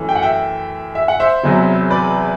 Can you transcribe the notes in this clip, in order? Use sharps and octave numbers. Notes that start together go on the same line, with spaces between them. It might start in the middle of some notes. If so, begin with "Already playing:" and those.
Already playing: F#2 E3 A3
G5
F#5
E5 G5
E5
F#5
C5 E5
E1 E2 C3 F#3
B4 D5